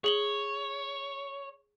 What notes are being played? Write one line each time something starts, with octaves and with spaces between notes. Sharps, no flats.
G#4 C#5 F#7 G7